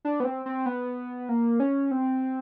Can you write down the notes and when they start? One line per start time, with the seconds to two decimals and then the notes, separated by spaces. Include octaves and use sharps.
0.05 D4
0.20 B3
0.25 C4
0.46 C4
0.66 B3
1.29 A#3
1.60 C#4
1.91 C4